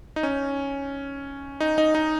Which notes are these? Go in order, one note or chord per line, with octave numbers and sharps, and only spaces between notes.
D#4
C#4
D#4
D#4
D#4